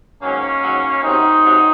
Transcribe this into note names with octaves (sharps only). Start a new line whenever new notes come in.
G#2 D#3 F#3 A#3 C#4
G#2 D#3 F#3
C3 D#3 F#3 C4 D#4
C3 F#3